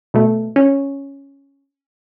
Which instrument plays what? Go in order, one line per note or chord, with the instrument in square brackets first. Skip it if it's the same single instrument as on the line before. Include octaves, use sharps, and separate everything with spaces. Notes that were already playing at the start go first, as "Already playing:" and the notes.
[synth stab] B2 A3
C#4